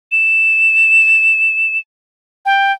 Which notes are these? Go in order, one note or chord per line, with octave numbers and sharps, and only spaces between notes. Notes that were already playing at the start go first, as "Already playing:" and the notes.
E7
G5